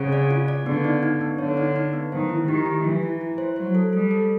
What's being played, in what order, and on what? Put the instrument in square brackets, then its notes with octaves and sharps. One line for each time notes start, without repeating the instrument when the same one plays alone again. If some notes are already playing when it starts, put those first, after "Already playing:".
Already playing: [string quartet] C#3 [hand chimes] C4
[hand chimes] D5
F4
D5
[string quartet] D3 [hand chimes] B3
[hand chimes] D#4
D#4
B3
[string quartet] D3 [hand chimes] C#5
[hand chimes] D#4
D#4
B3
[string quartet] D#3 [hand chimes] C5
[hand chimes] E4
[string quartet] D#3 [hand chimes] G4
[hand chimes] G4
[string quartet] E3 [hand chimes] E4
[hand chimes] E4
E4
C5
[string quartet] F#3 [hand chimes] C5
[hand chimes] A4
[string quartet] G3 [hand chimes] A4
[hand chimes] A4